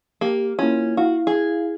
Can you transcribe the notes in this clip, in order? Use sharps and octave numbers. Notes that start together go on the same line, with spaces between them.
A#3 G4
A#3 C#4 E4 F4
E4 F#4 F5
G#4